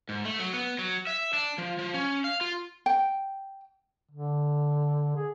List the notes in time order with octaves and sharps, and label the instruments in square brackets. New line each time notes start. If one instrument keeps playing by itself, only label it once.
[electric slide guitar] G#2
A3
F#3
B3
F#3
E5
D4
F3
F3
C#4
F5
F4
[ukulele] G5
[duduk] D3
G#4